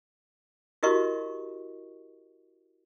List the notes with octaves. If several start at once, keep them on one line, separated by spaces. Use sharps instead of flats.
E4 F#4 G4 A#4 D#5 C#6